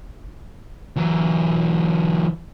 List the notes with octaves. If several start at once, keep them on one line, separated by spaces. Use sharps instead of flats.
E3 F#3